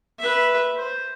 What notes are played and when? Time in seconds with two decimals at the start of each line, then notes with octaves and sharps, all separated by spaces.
0.19 B4 E5
0.77 C5